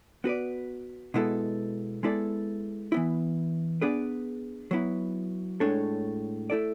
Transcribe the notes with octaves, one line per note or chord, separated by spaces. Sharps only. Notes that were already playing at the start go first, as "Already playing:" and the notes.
B3 F#4 B4 D5
B2 G#3 B3 E4 A4
G#3 B3 E4 A4 D5
E3 B3 E4
B3 D4 G#4 B4 D5
F#3 B3 E4
A2 G#3 D4 A4 C#5
A3 E4 A4 D5